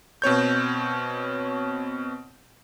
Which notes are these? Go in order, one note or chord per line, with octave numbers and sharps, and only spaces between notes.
B2 C4 C#5 G6